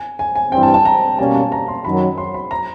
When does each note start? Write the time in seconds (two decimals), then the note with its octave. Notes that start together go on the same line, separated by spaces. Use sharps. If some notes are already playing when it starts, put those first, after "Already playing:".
Already playing: G#5
0.19 G#5
0.35 G#5
0.52 G2 E3 G3 C4 G5
0.63 A5
0.74 A5
0.85 A#5
1.18 B2 G3 A#3 C#4 A5
1.35 A5
1.52 A#5
1.68 C6
1.85 F#2 D#3 F#3 B5
2.18 C6
2.34 B5
2.51 A#5